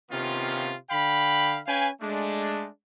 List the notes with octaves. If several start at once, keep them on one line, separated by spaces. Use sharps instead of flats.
C3 D#3 B3 C#4 F4
D3 F5 G5 B5
C#4 B4 F5 G5 G#5
G#3 A3 D4